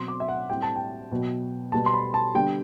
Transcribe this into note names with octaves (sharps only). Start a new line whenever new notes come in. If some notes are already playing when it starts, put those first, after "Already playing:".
Already playing: B2 F#3 C4 C6
D6
E5
F#5
A2 G3 C4 G5
A5
G5
B2 F#3 B3
B2 G3 B3 A5
C6
B5
A5
D3 G3 B3 G5